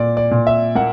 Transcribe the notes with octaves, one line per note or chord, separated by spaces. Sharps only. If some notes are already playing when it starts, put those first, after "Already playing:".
Already playing: A#2 D5
D5
A#2
E5
A#3 F#5